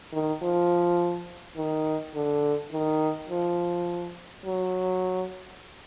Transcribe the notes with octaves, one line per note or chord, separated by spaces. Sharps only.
D#3
F3
D#3
D3
D#3
F3
F#3